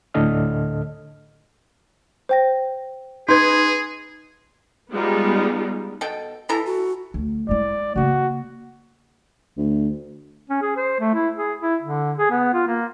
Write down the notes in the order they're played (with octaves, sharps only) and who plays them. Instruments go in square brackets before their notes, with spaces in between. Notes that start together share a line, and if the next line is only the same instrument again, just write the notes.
[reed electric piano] D2 A2 D3 A4 D#5 F6
[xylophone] C5 G5 A#6
[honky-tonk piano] D#4 B4 [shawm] G#4 [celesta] C6 [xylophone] G6 G#6
[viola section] G3 G#3 B3 D#4 F4
[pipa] B2 A4 G5
[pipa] E3 A4 A#5 [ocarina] E4
[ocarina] F#4
[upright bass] D2
[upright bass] G#3 E4 [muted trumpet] D5
[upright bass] C#3 A#3 [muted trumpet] F#4
[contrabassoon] D2
[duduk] C#4
G#4
C5
A3
E4
G#4
E4
D3
G#4
B3
F4
A#3